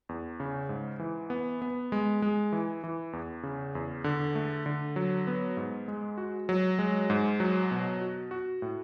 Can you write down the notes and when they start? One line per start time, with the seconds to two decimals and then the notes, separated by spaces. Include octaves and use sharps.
0.09 E2
0.40 C#3
0.69 G#2
0.99 E3
1.30 B3
1.62 B3
1.92 G#3
2.22 G#3
2.52 E3
2.84 E3
3.13 E2
3.43 C#3
3.75 E2
4.04 D3
4.35 A3
4.66 D3
4.96 F#3
5.27 B3
5.57 G#2
5.88 G#3
6.17 F#4
6.49 F#3
6.79 G#3
7.10 G#2
7.40 F#3
7.71 B2
8.01 F#4
8.31 F#4
8.62 A2